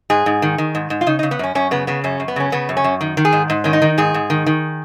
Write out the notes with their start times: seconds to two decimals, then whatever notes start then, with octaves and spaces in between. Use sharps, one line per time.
0.10 G#2 G#4
0.26 G#2
0.42 D#3
0.58 D#3
0.75 G#2
0.90 G#2
1.01 F4
1.07 C#3 D#4
1.19 D#4
1.23 C#3
1.31 B3
1.39 F#2 C#4
1.55 F#2 C#4
1.71 C#3 B3
1.87 C#3 B3
2.04 F#2 C#4
2.20 F#2
2.28 B3
2.36 C#3 C#4
2.52 C#3 B3
2.69 F#2
2.77 C#4
2.84 F#2
3.01 D#3
3.17 D#3
3.25 G#4
3.33 G#2
3.50 G#2
3.64 D#3 C#4
3.73 D#4
3.82 D#3
3.98 G#2 G#4
4.14 G#2
4.30 D#3
4.46 D#3